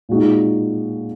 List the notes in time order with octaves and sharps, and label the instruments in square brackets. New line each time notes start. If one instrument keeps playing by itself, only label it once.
[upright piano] A#2 G#3 D#4 F#4